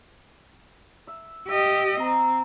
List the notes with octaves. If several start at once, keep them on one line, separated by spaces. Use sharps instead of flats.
E5
G4 D#5 E5
C4 A#5